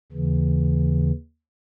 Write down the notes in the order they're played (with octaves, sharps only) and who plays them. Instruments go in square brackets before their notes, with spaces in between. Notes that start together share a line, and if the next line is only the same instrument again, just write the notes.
[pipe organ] D#2 C#3 E3